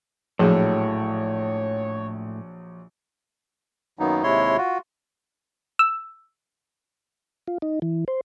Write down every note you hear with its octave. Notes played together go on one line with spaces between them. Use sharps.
A#1 A2 F3 F#3 G#4 C#5
F#2 D#3 F#3 A#3 B3 D#4
D#2 C3 G#3 E4 C#5 C6
F4 F#4
E6
F4
D#4
E3
C5